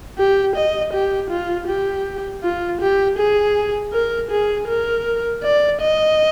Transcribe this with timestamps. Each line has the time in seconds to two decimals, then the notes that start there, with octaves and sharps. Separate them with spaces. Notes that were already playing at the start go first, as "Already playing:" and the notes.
0.19 G4
0.56 D#5
0.94 G4
1.31 F4
1.68 G4
2.43 F4
2.81 G4
3.19 G#4
3.93 A#4
4.31 G#4
4.68 A#4
5.44 D5
5.81 D#5